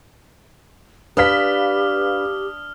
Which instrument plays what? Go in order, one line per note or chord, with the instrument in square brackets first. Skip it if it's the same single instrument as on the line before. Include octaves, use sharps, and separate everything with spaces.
[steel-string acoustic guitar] D4 [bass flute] G4 [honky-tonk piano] B4 F5 B6 [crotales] D#6 F6